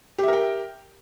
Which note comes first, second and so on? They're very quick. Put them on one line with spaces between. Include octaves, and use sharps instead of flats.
G4 E5 A#4 G5